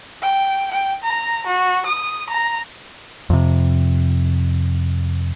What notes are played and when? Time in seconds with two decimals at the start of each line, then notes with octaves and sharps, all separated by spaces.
0.22 G5
0.71 G5
1.04 A#5
1.47 F#4
1.86 D#6
2.29 A#5
3.30 F2 C3